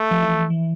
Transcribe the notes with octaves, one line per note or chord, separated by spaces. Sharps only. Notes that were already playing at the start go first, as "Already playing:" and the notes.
Already playing: A3
F3
E3
E3